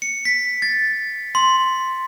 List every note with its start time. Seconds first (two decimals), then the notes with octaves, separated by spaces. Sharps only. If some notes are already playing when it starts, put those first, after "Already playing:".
0.02 C#7
0.25 B6
0.62 A6
1.35 C6